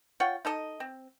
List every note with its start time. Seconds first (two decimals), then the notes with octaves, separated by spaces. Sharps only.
0.20 F4 C#5 F#5 G5
0.45 D#4 A4 D#5
0.80 C4